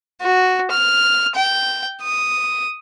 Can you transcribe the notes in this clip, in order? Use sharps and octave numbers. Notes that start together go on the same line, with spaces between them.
F#4
F6
G5
D#6